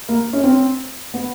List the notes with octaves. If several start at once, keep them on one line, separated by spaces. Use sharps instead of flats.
A#3
C#4
C4
B3